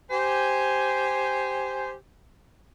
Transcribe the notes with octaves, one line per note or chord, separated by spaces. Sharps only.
G4 C5 G#5